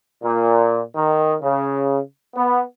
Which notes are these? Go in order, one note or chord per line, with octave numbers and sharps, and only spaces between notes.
A#2
D#3
C#3
B3